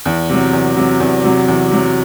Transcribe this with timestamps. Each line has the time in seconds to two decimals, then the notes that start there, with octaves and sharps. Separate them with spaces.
0.06 E2
0.30 C3 F#3
0.53 E2
0.77 C3 F#3
1.00 E2
1.24 C3 F#3
1.48 E2
1.71 C3 F#3